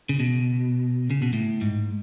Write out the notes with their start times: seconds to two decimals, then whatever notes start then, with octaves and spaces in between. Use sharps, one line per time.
0.09 C#3
0.20 B2
1.10 C#3
1.22 B2
1.33 A2
1.61 G#2